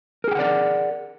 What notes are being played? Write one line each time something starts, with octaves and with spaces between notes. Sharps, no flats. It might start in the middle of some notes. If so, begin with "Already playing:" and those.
G#4 A#4 D5 F#5 G5